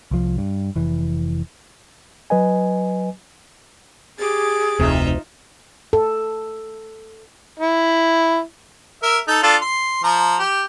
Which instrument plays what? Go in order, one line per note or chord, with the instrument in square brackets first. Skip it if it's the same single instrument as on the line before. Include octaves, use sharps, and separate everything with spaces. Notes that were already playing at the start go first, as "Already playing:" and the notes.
[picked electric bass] C2 F3
G2
F1 E3
[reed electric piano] F#3 B4 D#5 G#5
[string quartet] G4 D6 A6 [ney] G#4
[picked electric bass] F1 C3 [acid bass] D2 [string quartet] D#4 F4 E5
[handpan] A4
[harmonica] E4
A#4 E5
D#4 A4
D4 F4 A4
C6
F3 A#5
G4